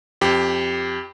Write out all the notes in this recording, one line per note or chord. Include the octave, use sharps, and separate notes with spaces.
F2 G4